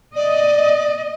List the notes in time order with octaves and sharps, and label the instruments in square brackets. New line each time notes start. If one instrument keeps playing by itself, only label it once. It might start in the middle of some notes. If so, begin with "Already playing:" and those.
[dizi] D5 [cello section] D#5